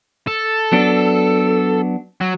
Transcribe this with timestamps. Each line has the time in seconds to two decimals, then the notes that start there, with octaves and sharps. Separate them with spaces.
0.27 A4
0.72 F#3 B3 D4
2.21 F#3